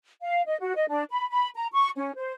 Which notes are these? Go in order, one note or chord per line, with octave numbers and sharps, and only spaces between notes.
F5
D#5
F#4
D#5
D4
B5
B5
A#5
C#6
C#4
C5